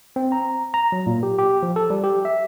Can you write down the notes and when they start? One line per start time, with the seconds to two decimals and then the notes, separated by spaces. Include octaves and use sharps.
0.16 C4
0.32 A#5
0.74 A#5
0.92 F#3
1.06 A#2
1.23 G4
1.39 G4
1.63 F3
1.76 A4
1.90 G3
2.04 G4
2.25 E5